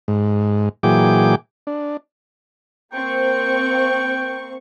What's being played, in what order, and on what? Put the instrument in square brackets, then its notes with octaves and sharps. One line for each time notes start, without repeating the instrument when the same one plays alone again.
[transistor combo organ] G#2
A#2 E3 F#3 G#4 G5 D6
D4
[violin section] A#3 C4 C#6 [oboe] G5